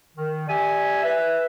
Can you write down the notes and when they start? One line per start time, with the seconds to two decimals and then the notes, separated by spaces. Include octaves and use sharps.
0.15 D#3
0.48 G4 D5 E5 G#5
1.02 B4 E5